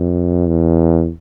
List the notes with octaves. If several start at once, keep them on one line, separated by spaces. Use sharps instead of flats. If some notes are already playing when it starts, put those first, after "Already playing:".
Already playing: F2
E2